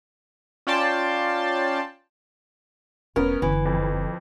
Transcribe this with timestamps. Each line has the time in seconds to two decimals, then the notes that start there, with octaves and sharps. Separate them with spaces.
0.67 C#4 F4 D5 G5 A5 C6
3.16 E1 B3 C#4 A#4
3.42 F#1 D3 E3
3.65 F2